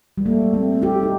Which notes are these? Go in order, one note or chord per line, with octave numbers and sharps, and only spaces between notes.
G3
A3 A#3
A3 C4
G4 A4
D#4